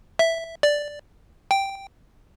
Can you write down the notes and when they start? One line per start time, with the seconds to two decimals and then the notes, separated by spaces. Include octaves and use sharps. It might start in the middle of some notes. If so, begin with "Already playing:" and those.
0.19 E5
0.63 D5
1.51 G5